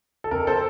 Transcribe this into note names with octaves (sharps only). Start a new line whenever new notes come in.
A4
F2 A#4
A4 C5